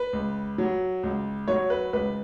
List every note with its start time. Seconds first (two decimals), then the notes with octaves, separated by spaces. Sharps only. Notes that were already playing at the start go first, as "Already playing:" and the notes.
Already playing: B4
0.13 C#2
0.58 F#3
1.03 C#2
1.48 F#3 C#5
1.70 B4
1.93 C#2 B4